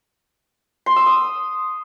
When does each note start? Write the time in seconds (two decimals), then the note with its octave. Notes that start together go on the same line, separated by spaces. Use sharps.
0.86 C6
0.96 E6
1.06 D#6